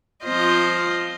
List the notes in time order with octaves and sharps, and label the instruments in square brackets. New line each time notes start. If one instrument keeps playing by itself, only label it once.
[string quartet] F3 C4 F4 C5 D#5